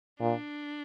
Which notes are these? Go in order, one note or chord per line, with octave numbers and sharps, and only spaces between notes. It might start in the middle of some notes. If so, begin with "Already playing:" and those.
A#2 D4